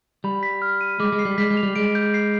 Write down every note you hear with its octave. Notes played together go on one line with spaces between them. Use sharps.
G3 B5
B6
F6
D#7
G#3 D6
G#3
C7
G3
G#3 B6
G#3
F7
G3
G#3 D7
G6
C7